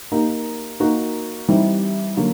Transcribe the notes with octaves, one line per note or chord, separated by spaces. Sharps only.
A#3 D#4 G4 A#4
A#3 D#4 F#4 A#4
E3 G3 C4 D#4 G4
D3 F#3 A#3